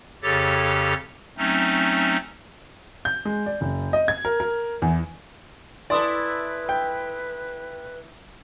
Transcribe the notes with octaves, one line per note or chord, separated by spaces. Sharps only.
F2 C#3 G4 A4 C#5 A6
F#3 A3 C4 C#4 D#4
G6
G#3
D5
F#1
D#5
G#6
A#4
A#4
E2
E4 A4 B4 D5 G#5 C6 D#6
G5